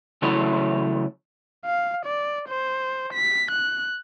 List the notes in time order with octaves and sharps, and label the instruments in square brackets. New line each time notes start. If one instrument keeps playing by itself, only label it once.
[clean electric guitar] C#3 E3 F#3 A3 E4 C#5
[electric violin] F5
D5
C5
B6
F#6